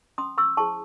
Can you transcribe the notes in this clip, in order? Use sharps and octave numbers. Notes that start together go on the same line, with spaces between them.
C#4 C6 D#6
C#6 E6
E4 G#4 C5 A5 C#6